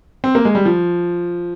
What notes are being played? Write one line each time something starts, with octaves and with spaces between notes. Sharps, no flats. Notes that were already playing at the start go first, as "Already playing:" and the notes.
C4
A#3
G#3
G3
F3